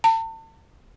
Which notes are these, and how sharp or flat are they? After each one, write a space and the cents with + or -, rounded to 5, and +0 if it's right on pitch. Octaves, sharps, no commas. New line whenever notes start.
A5 +35